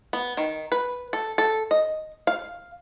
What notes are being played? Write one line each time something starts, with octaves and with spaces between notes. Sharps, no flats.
B3
D#3
B4
A4
A4
D#5
F5